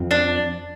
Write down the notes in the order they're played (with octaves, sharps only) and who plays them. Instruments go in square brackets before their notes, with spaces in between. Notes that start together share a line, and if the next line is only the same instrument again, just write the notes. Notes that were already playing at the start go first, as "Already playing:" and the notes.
Already playing: [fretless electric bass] F2 F3 C4
[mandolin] D4